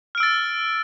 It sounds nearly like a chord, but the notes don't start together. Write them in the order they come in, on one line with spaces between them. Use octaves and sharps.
F6 D7 E6 A6